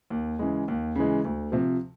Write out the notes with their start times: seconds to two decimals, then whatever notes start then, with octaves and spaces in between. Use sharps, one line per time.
0.10 D#2
0.39 C#3 E3 G#3
0.68 D#2
0.95 C#3 E3 G#3
1.25 D2
1.52 C3 F3